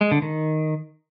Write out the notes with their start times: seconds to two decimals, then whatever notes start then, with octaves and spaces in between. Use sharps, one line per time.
0.01 G#3
0.11 D3
0.22 D#3